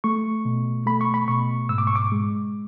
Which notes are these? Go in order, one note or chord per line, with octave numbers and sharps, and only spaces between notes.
A3 C#6
B2
A3 B5
C#6
B5
B2 C#6
G#2 E6
D6
C#6
D6
G#3